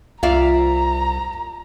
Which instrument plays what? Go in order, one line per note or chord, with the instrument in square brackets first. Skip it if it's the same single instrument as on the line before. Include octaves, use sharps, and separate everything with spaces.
[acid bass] C2 [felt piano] F4 [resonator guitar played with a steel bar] D5 E5 F5 [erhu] A#5